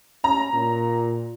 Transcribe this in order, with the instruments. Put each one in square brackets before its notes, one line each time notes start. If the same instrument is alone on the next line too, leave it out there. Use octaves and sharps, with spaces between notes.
[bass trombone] C#4 [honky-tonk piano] A#5
[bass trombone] A#2